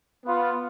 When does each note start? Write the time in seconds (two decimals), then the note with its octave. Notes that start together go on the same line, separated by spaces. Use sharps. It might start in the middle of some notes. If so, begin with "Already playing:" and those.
0.25 B3 F4